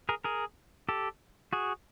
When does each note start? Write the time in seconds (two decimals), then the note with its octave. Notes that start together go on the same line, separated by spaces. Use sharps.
0.09 G#4 A#4
0.24 G#4 A#4
0.89 G4 A4
1.53 F#4 G#4